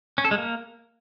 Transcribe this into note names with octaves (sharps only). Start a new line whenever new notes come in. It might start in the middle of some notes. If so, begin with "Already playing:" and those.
C#4
A4
G#3
A#3